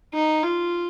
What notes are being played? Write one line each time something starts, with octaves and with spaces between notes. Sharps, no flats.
D#4
F4